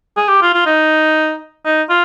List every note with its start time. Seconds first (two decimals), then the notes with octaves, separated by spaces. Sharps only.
0.17 G#4
0.29 G4
0.42 F4
0.54 F4
0.66 D#4
1.65 D#4
1.90 F4